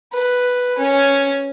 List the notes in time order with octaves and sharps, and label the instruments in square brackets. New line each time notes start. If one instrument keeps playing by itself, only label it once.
[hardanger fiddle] B4
C#4